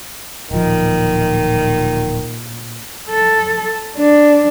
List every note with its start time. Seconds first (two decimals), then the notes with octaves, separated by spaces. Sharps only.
0.51 D1 A#2 D#3 F3
3.10 A4
3.97 D4